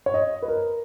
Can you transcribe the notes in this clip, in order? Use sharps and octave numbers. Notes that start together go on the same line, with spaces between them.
C#5
D#5
B4
A#4